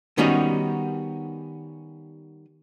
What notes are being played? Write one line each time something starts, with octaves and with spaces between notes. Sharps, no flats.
D#3 G3 B3 C#4 D#4 F#4